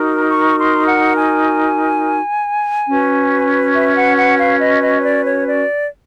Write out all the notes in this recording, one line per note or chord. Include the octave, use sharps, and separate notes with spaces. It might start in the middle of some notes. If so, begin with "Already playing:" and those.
Already playing: D#4 F#4 A#4
C#6
C6
F#5
G#5
C#4 F#4 B4
E5
F#5
F#5
F5
D#5
D#5
C#5
D5
C#5
D5